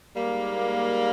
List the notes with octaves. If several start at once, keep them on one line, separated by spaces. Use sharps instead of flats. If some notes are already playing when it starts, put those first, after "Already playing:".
G#2 G3 A#3